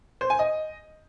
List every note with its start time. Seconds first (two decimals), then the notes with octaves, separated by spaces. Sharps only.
0.21 C5
0.30 G#5
0.39 D#5